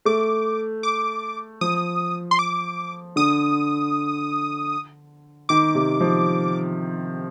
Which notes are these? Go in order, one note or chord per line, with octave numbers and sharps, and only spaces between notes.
A3 D6
D6
F3 D#6
C6
D6
D3 D#6
D#3 D6
C3
F3